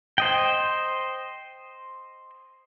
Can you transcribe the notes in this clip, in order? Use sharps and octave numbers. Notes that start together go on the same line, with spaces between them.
C5 D#5 G5